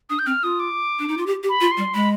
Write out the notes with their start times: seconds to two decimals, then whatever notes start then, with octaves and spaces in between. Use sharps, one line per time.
0.10 D4 D#6
0.19 G6
0.26 C4 F6
0.43 F4 D#6
0.60 D6
0.99 D4
1.08 D#4
1.17 F4
1.26 G4
1.43 G4
1.49 B5
1.61 F4
1.71 C6
1.77 G3
1.94 G#3 B5